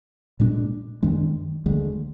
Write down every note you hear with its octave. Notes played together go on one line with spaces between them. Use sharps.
A#2 G#3 D4
F#2 D#3 G#3 D4
D2 D3 G#3